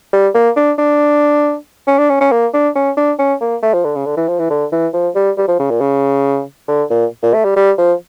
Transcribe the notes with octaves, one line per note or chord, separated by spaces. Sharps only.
G3
A#3
D4
D4
C#4
D4
C#4
C#4
A#3
D4
C#4
D4
C#4
A#3
A3
F3
D3
C#3
D3
E3
F3
E3
D3
E3
F3
G3
G3
F3
C#3
A#2
C#3
D3
A#2
A#2
A3
G3
G3
F3